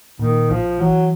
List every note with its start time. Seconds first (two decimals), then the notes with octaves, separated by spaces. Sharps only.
0.19 A#2 D#3
0.50 A#1 F3
0.79 E3 F#3